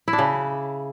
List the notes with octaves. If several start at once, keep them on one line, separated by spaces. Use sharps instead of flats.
E4
D4
C#3